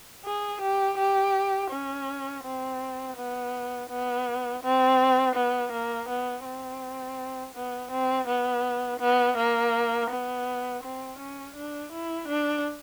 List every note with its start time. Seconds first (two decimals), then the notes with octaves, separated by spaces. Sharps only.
0.25 G#4
0.62 G4
0.98 G4
1.71 C#4
2.44 C4
3.17 B3
3.90 B3
4.63 C4
5.35 B3
5.72 A#3
6.09 B3
6.45 C4
7.55 B3
7.91 C4
8.28 B3
9.00 B3
9.37 A#3
10.11 B3
10.83 C4
11.19 C#4
11.56 D4
11.92 E4
12.28 D4